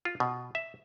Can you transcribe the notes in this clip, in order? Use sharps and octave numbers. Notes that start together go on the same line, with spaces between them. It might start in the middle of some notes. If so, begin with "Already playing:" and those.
F4
B2
E5